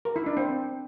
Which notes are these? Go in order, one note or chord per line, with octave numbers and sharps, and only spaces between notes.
A#4
E4
D4
C4